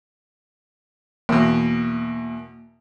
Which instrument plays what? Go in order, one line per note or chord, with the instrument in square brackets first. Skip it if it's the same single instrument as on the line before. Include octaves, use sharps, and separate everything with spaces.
[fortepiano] E2 B2 [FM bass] A#3